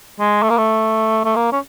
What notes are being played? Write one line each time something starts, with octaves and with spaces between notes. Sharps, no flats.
G#3
A3
A#3
A3
A3
A#3
C#4